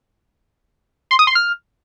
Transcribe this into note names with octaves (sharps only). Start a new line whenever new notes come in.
C6
D#6
C6
F6